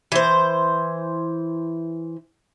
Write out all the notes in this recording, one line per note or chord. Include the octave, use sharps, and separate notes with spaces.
E3 C5